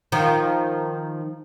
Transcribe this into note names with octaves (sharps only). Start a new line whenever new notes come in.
D#3 F3